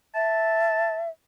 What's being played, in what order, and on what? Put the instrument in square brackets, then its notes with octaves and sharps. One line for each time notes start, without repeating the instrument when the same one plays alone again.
[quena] E5 [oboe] A5